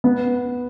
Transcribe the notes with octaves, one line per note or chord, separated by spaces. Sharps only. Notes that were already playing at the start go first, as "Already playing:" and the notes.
B3